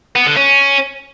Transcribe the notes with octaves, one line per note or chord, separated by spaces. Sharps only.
B3
D3
C#4